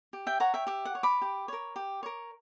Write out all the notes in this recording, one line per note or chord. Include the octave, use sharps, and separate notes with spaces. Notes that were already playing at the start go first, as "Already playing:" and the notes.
G4
E5 G5
C#5 F#5 A#5
E5 G5
G4 E5
F#5
C#5
B5 D6
G4
A#4 C#5
G4
A#4 C#5